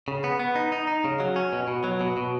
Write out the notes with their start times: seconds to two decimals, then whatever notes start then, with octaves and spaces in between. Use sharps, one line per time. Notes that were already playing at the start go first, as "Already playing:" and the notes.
0.08 C#3
0.24 B3
0.39 B3
0.56 D#4
0.72 D#4
0.87 D#4
1.05 C#3
1.20 F#3
1.36 C#4
1.53 B2
1.68 B2
1.84 F#3
2.01 B2
2.17 B2